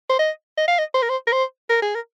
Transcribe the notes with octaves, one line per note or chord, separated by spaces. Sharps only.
C5
D#5
D#5
F5
D#5
C5
A#4
C5
A#4
C5
A#4
G#4
A#4